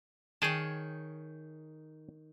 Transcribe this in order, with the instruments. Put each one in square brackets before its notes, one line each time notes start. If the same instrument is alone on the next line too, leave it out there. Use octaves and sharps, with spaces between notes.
[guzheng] D#3 C#5 [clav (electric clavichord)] G#4 G5 A5